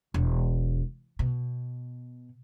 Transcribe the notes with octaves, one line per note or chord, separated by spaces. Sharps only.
E1
B2